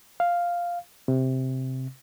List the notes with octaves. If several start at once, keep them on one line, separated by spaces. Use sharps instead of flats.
F5
C3